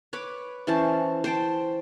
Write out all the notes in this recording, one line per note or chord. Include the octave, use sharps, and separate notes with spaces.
B4 C#5 D6
E3 C#4 C5 A5
C5 G5 A5